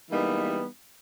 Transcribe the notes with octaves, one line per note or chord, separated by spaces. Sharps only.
E3 G3 G#3 A#3 B3 D#4